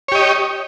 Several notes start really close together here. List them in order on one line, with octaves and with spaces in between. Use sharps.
C#5 G4 D#5